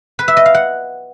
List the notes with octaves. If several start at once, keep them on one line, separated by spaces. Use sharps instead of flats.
B4
E5
D#5
F5
F#5